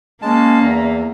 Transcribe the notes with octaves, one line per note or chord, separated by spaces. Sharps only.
G#3 A#3 C#4 A5
E2 D5 E5 A#5